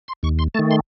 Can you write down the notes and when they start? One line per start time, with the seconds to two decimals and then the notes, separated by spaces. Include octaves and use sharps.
0.08 C6
0.23 D#2 C#6
0.39 C6
0.54 A3 A5
0.59 D#3
0.71 C6